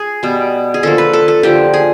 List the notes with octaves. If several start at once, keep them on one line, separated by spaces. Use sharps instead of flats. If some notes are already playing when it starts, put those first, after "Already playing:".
Already playing: G#4
B2 G3 B3
G#4
D3 F3 A#3 A4
B4
A4
A4
D3 F3 A#3 G4
G#4